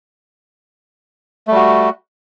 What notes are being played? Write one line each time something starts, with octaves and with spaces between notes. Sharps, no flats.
G3 A3 F#4